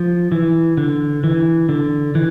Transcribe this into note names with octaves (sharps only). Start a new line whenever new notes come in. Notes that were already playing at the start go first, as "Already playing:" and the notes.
Already playing: F3
E3
D3
E3
D3
E3